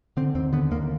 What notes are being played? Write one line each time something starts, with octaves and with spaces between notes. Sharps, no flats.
D3 C4
D#2 C4
D3 B3
D#2 A#3